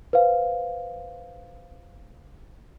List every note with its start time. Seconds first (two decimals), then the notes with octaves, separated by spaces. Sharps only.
0.13 B4 C5 F5